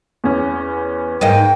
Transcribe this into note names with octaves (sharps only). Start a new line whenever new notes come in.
E2 B3 C#4
G#2 A#3 D#4 G5